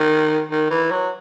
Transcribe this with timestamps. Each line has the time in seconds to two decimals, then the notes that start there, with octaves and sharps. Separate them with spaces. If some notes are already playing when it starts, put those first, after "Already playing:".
Already playing: D#3
0.51 D#3
0.70 E3
0.91 F#3